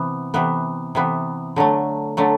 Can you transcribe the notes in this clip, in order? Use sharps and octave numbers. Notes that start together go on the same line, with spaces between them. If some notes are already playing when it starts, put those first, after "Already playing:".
Already playing: C3 E3 B3
C3 E3 B3
C3 E3 B3
D3 F#3 A3
D3 F#3 A3